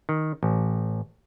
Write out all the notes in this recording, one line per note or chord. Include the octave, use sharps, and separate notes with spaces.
D#3
A1